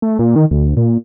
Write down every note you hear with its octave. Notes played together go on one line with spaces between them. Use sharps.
A3
A#2
D#3
D2
A#2